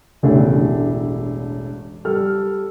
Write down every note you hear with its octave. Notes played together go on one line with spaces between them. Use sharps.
E1 A1 A3 D4 E4
G3 A4 F6